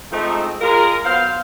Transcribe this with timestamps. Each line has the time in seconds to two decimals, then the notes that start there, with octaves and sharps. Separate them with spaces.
0.11 F3 G#3 A3 C4 D#4
0.61 G#3 F4 G#4 A#4
1.05 F#3 B3 C5 F5